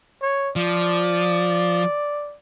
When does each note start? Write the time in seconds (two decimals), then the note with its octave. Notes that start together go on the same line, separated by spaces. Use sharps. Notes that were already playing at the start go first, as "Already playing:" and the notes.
0.22 C#5
0.56 F3 D5